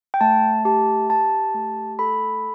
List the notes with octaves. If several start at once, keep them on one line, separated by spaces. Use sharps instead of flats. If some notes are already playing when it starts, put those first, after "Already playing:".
G5
A3 A5
G4 A5
G4 A5
A3
A4 B5